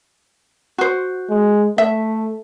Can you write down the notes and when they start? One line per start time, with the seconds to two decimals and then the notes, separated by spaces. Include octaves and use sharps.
0.78 F#4 C5
1.30 G#3
1.78 A3 E5